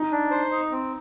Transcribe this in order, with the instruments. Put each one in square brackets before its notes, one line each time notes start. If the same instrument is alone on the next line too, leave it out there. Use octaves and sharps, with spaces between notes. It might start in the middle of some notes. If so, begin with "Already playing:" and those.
Already playing: [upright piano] D#4
[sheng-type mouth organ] D4
C5
D#4
C4